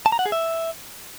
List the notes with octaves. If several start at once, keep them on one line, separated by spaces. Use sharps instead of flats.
A5
A#5
F#5
G#4
E5